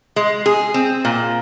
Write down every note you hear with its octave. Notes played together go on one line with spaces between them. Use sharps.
G#3
G#4
C4
A#2